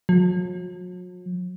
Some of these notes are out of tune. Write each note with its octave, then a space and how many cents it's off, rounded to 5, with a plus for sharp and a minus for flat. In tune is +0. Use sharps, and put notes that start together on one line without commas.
F#3 -45